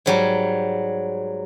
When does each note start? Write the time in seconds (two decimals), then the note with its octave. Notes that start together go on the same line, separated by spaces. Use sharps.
0.06 G#2 F#3 G3